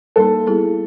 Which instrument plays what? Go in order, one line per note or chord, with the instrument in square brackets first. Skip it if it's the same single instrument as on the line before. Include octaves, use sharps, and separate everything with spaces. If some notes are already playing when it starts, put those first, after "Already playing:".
[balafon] G3 A#3 D#4 [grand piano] A4
[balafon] G3 B3 E4 G#4